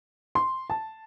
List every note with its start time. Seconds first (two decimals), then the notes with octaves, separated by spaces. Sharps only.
0.35 C6
0.70 A5